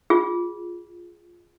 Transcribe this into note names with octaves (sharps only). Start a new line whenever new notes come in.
F4 G#4